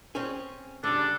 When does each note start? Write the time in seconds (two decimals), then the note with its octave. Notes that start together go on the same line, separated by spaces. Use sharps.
0.15 C4 C#4 G#4
0.84 C#3 G3 D4 A4